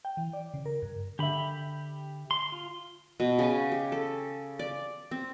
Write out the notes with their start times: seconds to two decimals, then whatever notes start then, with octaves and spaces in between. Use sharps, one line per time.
0.05 G5
0.17 E3
0.33 D5
0.54 C#3
0.66 A#4
0.82 G2
1.19 D3 G4 E5 B5
2.31 C6
2.52 F4
3.20 B2
3.39 C#3
3.72 G4
3.92 A4
4.59 D5
5.11 C4